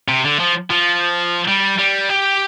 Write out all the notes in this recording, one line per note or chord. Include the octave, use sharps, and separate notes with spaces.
C3
D3
F3
F3
G3
G3
G4